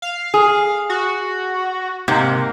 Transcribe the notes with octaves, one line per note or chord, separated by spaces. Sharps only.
F5
G#4
F#4
G#2 C3 A#3